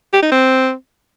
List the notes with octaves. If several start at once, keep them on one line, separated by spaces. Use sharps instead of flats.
G4
D#4
C4